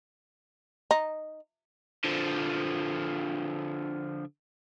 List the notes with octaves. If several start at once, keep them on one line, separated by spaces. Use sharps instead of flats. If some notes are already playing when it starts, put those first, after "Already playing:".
D#4
D3 F3